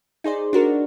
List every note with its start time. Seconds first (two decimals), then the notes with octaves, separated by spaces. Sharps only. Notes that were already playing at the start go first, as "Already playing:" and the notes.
0.24 D#4 G#4 C5 D5
0.53 D4 F#4 A#4